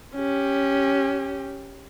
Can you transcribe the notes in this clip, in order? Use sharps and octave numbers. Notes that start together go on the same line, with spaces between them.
C#4 G4